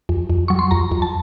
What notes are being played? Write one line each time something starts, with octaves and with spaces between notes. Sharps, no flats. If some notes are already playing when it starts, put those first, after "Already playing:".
F2
F2
F#3 C#6
C6
F2 A#5
F2
A5